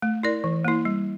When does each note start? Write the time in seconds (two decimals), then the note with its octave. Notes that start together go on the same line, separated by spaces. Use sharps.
0.02 A3
0.23 E4 A#4 D5
0.44 E3
0.65 A#3 E4
0.85 G3